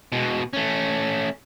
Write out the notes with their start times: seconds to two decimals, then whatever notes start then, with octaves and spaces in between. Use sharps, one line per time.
0.12 B2 G#3
0.53 A3 C#4